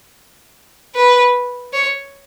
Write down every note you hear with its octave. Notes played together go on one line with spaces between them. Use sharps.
B4
C#5